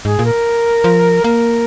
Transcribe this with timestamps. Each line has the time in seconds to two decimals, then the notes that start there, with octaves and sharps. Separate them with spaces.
0.05 G#2 G#4
0.19 A#2
0.25 A#4
0.84 F3
1.24 A#3 A#4